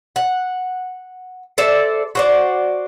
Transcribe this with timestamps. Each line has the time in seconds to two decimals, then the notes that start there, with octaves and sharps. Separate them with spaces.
0.16 F#5
1.58 A4 C5 D5 E5
2.15 F#4 C5 D5